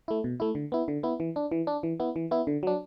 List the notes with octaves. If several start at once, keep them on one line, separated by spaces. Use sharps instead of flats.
A3 E4
B2
A3 E4
D3
B3 E4
D3
B3 E4
E3
D4
E3
D4
E3
B3 E4
E3
B3 E4
D3
F#3 D4